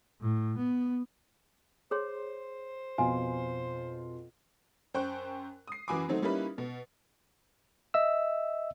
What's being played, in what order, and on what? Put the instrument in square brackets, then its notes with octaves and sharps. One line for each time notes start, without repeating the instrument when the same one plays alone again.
[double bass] A2
B3
[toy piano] G#4 C#5 C6 [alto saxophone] C5
[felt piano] F2 B2 F4 [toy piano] G#5
[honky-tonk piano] F#2 C5 G5 C#6 F#6
D#6 C7
F#2 E3 F#4 G#5 B5 D6
D#3 F#3 A3 C4 D#4
G3 A#3 C#4 D#4 E4 B4
B2
[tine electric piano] D#5 E5 E6